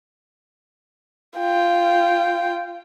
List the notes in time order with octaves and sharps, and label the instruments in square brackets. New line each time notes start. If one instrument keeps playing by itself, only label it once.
[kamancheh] F4 G5